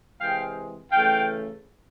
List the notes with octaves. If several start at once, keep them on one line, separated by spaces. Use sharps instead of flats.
C3 E3 G#3 F5 G5
C#3 E3 A3 F5 G5